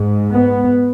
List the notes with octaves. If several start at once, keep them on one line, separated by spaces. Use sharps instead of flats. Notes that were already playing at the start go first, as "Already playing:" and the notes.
Already playing: G#2
B3